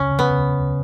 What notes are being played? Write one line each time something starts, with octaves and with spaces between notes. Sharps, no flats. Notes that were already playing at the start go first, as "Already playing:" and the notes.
Already playing: C#3 C#4
C#3
B3
C#3